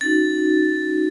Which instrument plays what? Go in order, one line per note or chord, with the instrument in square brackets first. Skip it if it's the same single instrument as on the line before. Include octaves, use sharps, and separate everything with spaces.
[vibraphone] C#4 D#4 F#4 [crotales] A6